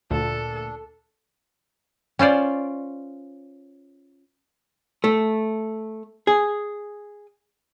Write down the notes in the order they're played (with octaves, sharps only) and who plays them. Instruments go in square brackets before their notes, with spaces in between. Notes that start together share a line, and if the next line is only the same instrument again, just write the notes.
[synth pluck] D2 [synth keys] A#2 A3 [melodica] D4 [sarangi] A4
[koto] C#4 F4 C5 D5
[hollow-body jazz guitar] A3
G#4